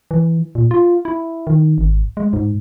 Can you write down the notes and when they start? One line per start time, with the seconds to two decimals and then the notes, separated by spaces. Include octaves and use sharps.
0.11 E3
0.55 A#2
0.71 F4
1.05 E4
1.47 D#3
1.78 G#1
2.17 G#3
2.33 G#2